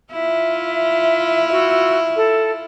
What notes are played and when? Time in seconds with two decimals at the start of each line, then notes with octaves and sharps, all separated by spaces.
0.12 E4 F4 E5
1.51 F#4 E6
2.17 A4